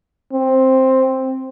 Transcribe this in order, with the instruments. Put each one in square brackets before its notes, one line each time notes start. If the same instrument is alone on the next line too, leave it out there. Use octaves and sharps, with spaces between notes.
[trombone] C4